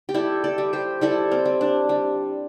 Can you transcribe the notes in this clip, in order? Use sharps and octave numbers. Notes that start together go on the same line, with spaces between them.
G4
G3 E4 A4
A4 D5
G3
G4 C5
G3 E4 A4
C4
G3
D4
G3